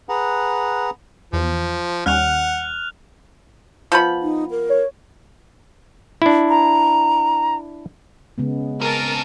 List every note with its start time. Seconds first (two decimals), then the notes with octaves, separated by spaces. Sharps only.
0.09 G#4 B4 F#5 A#5
1.33 E2 F3
2.06 D#2 G3 C#4 F#5 F6 F#6 F7
3.92 F3 B3 B5
4.23 D#4
4.51 A#4
4.69 C#5
6.22 D4 E4
6.49 A#5
8.38 C#3 G#3 B3
8.81 C4 G#4 A#4 A5